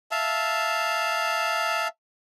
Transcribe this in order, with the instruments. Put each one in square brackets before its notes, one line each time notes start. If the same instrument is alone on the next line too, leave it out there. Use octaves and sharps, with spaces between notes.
[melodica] E5 F5 A5